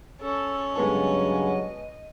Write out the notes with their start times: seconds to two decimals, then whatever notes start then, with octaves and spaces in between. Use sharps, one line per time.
0.21 C#4 A4
0.75 G2 C#3 F#3 G#3 B3 A4 D#5